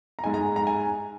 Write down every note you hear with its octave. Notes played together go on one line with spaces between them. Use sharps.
A#5
G#2 G#3 D#4 G#5
A#5
A#5
G#5